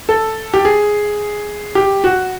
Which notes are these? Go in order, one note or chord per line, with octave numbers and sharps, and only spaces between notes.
A4
G4
G#4
G4
F#4